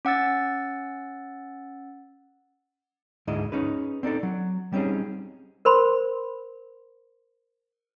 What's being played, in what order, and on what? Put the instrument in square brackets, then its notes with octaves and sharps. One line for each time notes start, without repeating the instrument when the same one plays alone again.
[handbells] C#4 F#5 E6 A6
[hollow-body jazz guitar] D2 G#2 G#3 E4 D#5
C#4 D#4 G#4 B4
C4 D4 D#4 A4
F#3
G3 C4 C#4 D#4 G#4
[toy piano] A#4 C5 B5 C6